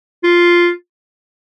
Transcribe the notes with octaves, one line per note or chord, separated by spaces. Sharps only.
F4